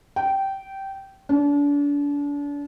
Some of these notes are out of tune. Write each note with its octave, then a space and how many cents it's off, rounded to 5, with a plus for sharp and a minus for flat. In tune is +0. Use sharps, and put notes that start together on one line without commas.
G5 -15
D4 -35